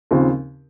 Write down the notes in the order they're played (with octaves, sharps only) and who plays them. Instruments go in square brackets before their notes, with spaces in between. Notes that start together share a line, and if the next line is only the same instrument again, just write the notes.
[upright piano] D#2 C#3 F3 C4